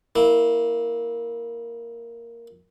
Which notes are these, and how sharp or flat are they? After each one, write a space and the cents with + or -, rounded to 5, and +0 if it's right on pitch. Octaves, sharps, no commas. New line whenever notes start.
A#3 +0 E4 -15